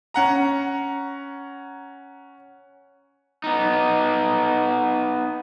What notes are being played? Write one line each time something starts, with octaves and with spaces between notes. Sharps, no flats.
C#4 F#5 A#5
B3 D#4